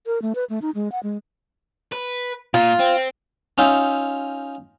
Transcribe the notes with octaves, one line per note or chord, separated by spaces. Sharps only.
A#4
A3
B4
A3
D#4
G#3
F#5
G#3
B4
A#2 F4
C4
C#4 D#4 F4 E5 G5